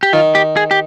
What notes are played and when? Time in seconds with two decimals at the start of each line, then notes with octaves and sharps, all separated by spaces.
0.03 G4
0.13 D#3 F4
0.35 G4
0.57 G#4
0.71 G4